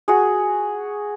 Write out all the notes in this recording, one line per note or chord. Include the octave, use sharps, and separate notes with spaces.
F#4 G#4